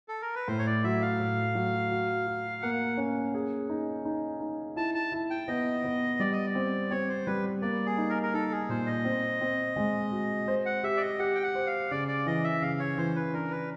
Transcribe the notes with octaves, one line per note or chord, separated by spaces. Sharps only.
A4
A#4
B4
A2 C5
C#5
D5
F#3 E5
F5
A2
F#3
F#4
F#4
A#3 F#5
C#4
G#4
D#4
D#4
D#4
E4 A5
A5
E4
G5
B3 D#5
B3
G3 D5
D#5
D5
C4
C4 C#5
C5
G3 B4
A#3 D5
G#4
D#4
A#4
A#4
D#4 A4
G#4
A#2 C5
D#5
C4
C4
G#3
F#4
C5
F#5
G4 E5
D5
D#5
G4 F#5
G5
F#5
C5
F5
C#3 D5
D5
E3 D#5
E5
C#3 F5
C#5
E3 C5
B4
D4 A#4
B4